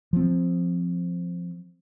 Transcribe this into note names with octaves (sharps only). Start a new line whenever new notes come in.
F3 C4